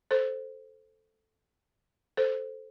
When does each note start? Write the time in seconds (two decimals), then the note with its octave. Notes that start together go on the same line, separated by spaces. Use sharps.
0.11 A4 C5
2.17 A4 C5